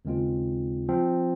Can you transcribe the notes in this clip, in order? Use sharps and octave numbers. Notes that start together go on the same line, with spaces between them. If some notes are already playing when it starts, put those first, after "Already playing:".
D#2 C#3 G#3 C4 F4
F3 C4